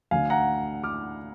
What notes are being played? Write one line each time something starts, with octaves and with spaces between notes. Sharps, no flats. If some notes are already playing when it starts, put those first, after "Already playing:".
D2 D3 F5 G#5
F#5 A#5
D6 F6